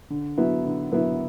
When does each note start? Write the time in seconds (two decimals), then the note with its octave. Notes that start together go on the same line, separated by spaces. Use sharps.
0.10 D3
0.37 F#3 B3 E4
0.64 D3
0.91 F#3 B3 E4